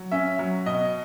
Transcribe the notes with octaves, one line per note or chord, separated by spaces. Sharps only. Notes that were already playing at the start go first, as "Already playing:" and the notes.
Already playing: F#3
C#4 E5
F#3
B2 D#5